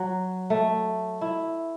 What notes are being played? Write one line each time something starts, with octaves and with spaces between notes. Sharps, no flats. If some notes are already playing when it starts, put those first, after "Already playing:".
Already playing: F#3
A3
E4